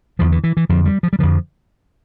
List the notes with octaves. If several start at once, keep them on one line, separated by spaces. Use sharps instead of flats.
E2 D3 F3
E3
E3
E3
F2 D3 F3
G3
F3
G3
F2 D3 F3